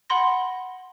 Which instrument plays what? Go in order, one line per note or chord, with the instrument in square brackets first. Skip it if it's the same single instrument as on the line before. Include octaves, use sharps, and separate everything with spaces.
[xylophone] F#5 B5 C6 A#6